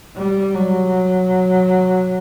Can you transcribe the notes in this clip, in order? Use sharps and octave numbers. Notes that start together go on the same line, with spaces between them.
G3
F#3